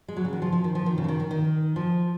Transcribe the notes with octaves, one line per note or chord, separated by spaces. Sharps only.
G#3
F#3
C#3
D#3
F3
F3
D#3
F3
D#3
C#3
F3
D#3
D#3
D#3
F3